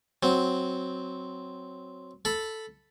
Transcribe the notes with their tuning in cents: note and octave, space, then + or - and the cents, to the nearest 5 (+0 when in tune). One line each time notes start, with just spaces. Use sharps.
F#3 +0 C4 +0
A4 +0 B5 +0